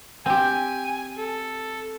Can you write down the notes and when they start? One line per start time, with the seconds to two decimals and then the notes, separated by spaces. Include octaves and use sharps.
0.26 C4 G4 G#5
1.18 A4